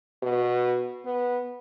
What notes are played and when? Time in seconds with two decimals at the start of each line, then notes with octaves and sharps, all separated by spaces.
0.23 B2
1.06 B3